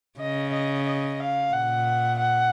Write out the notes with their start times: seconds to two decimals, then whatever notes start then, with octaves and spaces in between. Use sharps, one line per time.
0.20 C#3 D#5
0.53 D#5
0.87 D#5
1.20 F5
1.53 A#2 F#5
2.20 F#5